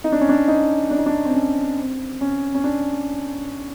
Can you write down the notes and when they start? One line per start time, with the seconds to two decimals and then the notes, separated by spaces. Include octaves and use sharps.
0.04 D#4
0.12 D4
0.21 C#4
0.29 D4
0.48 D#4
0.91 D4
0.98 D#4
1.06 D4
1.25 C4
1.34 C#4
1.77 C4
2.21 C#4
2.55 C#4
2.64 D4